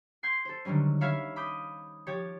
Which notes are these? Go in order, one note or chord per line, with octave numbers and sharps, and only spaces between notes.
C6 G6 G#6 C7
A4 C5
D3 D#3 F#3 G3 C#4
C#5 E5 F5 B5 F6 G#6
B5 D6 D#6 G6
F3 G4 C#5 G#6